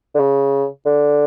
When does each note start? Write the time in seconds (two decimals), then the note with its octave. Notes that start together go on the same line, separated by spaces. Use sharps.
0.15 D3
0.19 C#3
0.86 D3